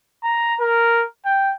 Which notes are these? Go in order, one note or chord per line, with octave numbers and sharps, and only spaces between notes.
A#5
A#4
G5